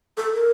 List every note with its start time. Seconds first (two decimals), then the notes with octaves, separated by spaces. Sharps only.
0.17 A4
0.33 A#4